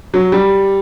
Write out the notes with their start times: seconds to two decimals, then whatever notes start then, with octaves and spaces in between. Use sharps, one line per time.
0.14 F#3
0.32 G3